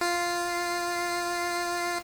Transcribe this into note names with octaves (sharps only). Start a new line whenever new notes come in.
F4 C7